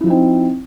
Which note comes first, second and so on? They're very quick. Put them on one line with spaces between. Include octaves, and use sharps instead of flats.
E4 F3 D#4 C4